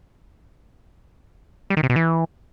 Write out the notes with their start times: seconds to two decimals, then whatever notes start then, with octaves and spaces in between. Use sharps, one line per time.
1.70 G3
1.77 D#3
1.83 C3
1.90 B2
1.96 E3